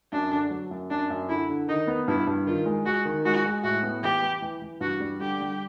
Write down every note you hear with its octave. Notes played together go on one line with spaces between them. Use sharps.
F#2 D4
D3
F#3
F#2
F#2 D4
F#2
D3 E4
D3
D#3 D#4
B3
G2 E4
G2
D#3 F4
G#3
G#3 F#4
D#3
G#3 F#4
G#3
A2 F#4
B3
E3 G4
E3
E3
E3
G2 F#4
G3
D3 G4
G3